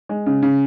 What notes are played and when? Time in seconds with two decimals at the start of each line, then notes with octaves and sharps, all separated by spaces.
0.09 G#3
0.26 C#3
0.43 C#3